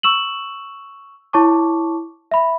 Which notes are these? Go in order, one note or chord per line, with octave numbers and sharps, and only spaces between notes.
C#6 E6 E7 F#7
E4 C#5 A5 C#6 D6
E5 B5